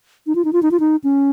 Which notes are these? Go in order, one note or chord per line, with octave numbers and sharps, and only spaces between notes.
D#4
F4
D#4
F4
D#4
F4
D#4
C#4